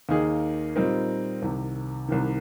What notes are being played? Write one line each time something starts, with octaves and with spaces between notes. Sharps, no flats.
D#2 D#3 A#3 D#4 G#4
A#2 G3 C4 D#4 A#4
C2 C3 D#3
C2 C3 D#3